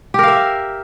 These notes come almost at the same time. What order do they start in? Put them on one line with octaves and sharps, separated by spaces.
G4 A#4 F5 E5